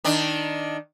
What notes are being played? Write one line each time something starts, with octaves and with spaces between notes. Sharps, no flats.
D#3 D4